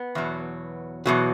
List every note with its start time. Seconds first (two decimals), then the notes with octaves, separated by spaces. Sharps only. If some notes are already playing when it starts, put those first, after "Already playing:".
Already playing: B3
0.15 E2 B2 F#3
1.06 E2 B2 F#3